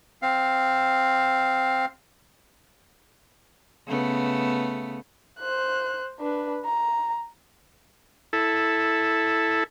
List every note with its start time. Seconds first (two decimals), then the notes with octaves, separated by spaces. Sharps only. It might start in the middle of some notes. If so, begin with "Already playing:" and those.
0.22 C4 F5
3.87 C#3 A3 B3
5.40 C5 F#6
6.20 D4 B4
6.65 A#5
8.33 E4 A4